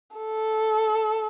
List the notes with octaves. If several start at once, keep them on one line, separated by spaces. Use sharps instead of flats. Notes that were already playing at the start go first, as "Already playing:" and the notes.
A4